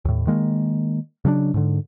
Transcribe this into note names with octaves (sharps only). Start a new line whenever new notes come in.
D#2 A2
D#3 G#3 A#3
C#3 F#3 C#4 D4
G#2 D3